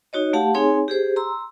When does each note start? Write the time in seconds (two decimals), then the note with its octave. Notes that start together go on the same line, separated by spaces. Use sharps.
0.13 D#4 F#4 C#5 D#5
0.33 A3 G4 F5 F#5 A5
0.54 C4 D#4 G#4 C#5 G#5 C6
0.88 G4 G#4 C5
1.16 A#5 C6 E6